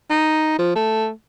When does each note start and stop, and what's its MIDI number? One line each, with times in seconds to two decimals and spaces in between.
0.10 0.56 63
0.59 0.75 53
0.76 1.10 57